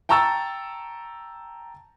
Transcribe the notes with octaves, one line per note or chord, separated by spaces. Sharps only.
G5 A5 A#5 C#6 E6 A6